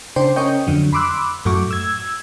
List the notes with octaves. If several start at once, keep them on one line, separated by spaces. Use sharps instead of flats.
C#3 D4 C5 G5
C#4 A#4 C#5 D#5 G5
F2 D3 F#3
B5 C6 D6 E6 F#6
F#2 A2 A3 F#4 C#6 D6
E6 G#6